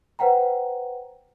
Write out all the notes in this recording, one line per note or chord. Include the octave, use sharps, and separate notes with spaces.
B4 C5 F#5 G5 A#5